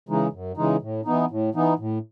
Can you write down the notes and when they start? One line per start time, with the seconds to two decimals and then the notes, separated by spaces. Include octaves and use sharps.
0.09 C#3 E3 G#3 D#4
0.33 F#2
0.57 C#3 E3 G#3 D#4
0.82 A2
1.05 E3 B3 D#4
1.30 A2
1.54 E3 B3 D#4
1.79 A2